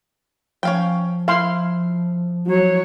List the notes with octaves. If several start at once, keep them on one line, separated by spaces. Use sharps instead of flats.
F3 C#4 F5 G5
E4 F5 C6
F#3 C#5